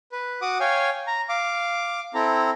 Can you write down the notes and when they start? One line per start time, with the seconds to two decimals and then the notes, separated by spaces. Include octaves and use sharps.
0.12 B4
0.42 F#4 F#5 D6 D#6
0.60 C#5 F5 G5 G#5
1.07 A#5
1.29 F5 D6
2.14 C4 E4 A4 A#5